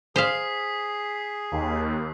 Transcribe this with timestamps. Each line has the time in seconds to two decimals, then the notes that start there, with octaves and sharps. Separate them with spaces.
0.16 G#4 C5 F5 D#6 B6 C7
1.52 D#2